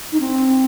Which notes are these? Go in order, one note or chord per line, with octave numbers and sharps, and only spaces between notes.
D#4
C4